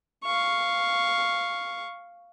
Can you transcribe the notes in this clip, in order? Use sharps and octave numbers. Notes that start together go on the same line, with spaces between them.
F5 C#6